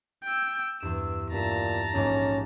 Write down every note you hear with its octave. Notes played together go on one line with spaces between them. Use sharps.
G5 E6
E2 G2 E6 E7
G2 A#2 E5 A5 A#5
A#1 G#2 A#3 C#4